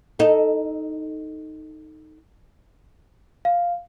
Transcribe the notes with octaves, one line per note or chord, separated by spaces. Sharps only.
D#4 A4
F5